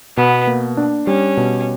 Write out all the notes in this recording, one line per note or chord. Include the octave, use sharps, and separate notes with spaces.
B2 B3
A#3
D4
G3 C#4
B2